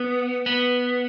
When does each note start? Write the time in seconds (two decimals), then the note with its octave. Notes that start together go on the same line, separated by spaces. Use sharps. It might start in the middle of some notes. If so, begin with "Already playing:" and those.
Already playing: B3
0.46 B3